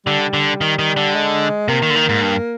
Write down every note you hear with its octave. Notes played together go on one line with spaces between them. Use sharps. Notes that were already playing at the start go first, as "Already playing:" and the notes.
D3 G3
D3
D#3
D#3
D3
G#3
C3 A#3
D#3
D3
D#3
G#2
G2